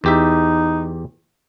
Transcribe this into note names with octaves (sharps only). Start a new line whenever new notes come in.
E2 D#4 G4 E5